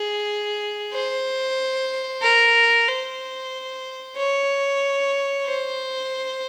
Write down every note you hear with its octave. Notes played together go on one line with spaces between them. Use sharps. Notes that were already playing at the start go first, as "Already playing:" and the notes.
Already playing: G#4
C5
A#4
C5
C#5
C5